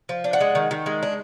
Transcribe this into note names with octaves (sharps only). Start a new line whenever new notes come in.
F3
D4
F#5
G#3
D#3
D#3
G#3
D4